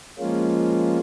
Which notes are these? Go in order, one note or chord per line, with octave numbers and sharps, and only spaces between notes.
F3 G#3 A#3 C#4 F4